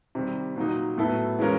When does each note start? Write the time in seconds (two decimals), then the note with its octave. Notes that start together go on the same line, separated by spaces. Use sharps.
0.15 C3 D#3 G3
0.56 A#2 F#3 A#3 D#4
0.98 A2 F#3 B3 E4 A4
1.39 E3 G#3 C#4 F4 A#4